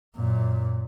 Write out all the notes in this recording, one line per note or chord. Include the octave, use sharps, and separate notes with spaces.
F#2 A#2